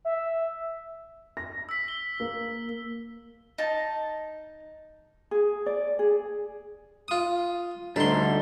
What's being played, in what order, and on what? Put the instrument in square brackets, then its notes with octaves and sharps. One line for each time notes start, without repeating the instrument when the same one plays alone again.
[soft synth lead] E5
[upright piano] A#6
[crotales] E6 B6
G7
[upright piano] A#3
[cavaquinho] D#4 A5
[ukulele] G#4
D5
G#4
[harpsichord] F4 D#6
[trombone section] D2 D3 [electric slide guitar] G3 D#4 [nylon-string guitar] D4 [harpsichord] A4 C6